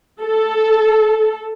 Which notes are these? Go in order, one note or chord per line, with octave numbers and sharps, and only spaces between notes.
A4